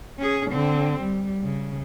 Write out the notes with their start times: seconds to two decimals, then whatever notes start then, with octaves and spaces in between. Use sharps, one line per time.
0.20 C#4 G#4
0.50 D3 C4
1.00 G3
1.44 C#3